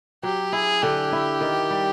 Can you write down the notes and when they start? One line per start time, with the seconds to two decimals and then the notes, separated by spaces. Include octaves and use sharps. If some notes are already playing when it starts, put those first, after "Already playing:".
0.23 F#3 G4
0.53 E4 G#4
0.82 D3 G4
1.13 E4
1.41 D#3
1.71 G3